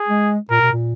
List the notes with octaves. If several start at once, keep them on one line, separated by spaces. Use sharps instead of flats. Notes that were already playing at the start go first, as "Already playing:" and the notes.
Already playing: G#4
G#3
A#2 A#4
B2
A#2